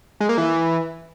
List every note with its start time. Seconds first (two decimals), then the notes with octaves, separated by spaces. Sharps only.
0.20 G#3
0.29 A#3
0.38 E3